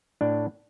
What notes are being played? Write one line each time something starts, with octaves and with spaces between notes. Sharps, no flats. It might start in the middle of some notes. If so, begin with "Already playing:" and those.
A2 D4